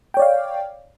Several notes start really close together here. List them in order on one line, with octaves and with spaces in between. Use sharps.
G5 C#5 D5 F5